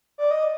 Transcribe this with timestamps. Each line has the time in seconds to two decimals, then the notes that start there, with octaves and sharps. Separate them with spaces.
0.18 D5
0.31 D#5